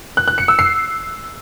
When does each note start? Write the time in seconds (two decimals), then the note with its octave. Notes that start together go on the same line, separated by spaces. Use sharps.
0.17 F#6
0.28 F#6
0.38 C#7
0.48 E6
0.59 C7